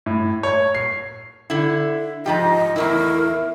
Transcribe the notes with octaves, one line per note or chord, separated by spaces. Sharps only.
A2
C#5
C7
D3 E4
G#2 F3 G4 D#5
E2 A2 E4 A#4